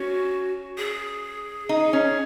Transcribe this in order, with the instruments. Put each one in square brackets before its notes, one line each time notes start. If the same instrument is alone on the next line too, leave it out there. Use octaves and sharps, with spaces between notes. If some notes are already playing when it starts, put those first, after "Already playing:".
Already playing: [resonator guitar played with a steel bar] C#4 [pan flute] F#4
[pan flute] G#4
[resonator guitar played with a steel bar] D#4
C#4